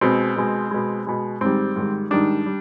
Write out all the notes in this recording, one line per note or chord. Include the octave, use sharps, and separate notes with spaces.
B2 G#3 C4
B2 G#3
B2 G#3
B2 G#3
G#2 D#3 G3 C4
G#2 D#3 G3
G#2 D#3 G3 D4
G3